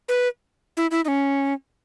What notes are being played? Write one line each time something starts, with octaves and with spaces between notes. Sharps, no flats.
B4
E4
E4
D#4
C#4